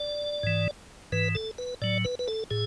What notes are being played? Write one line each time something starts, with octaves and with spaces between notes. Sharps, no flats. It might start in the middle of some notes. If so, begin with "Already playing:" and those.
Already playing: D5
G#2 E3
G#2 E3 B4
A4
B4
A2 F#3 D5
B4
B4
A4
A2 G#4